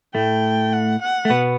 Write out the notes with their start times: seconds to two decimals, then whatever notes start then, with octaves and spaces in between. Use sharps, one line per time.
0.15 A2 A3 G5
0.73 F#5
1.02 F#5
1.25 A3
1.30 B2 B3